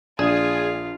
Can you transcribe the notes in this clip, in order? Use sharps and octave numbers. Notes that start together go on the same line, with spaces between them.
A#1 F4 G#4 D5